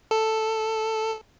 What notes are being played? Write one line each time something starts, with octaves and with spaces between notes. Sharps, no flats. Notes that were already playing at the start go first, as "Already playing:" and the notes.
A4